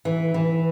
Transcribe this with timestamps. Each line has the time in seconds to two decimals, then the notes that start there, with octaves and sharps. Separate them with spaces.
0.05 E3
0.34 E3